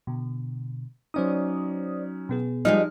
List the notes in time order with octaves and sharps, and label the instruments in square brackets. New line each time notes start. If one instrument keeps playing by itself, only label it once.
[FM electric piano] B2 D3
[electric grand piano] F#3 C#4 D#4 [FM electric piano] C5 D5 D#6
[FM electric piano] B2 B3 G#4
[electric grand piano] F3 F6 [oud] G3 G#3 D#4